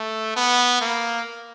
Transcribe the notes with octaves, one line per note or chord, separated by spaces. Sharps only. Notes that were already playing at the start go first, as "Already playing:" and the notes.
Already playing: A3
B3
A#3